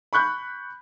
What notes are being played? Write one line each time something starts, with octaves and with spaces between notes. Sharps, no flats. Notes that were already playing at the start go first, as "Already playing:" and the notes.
B5 C#6 F#6 G6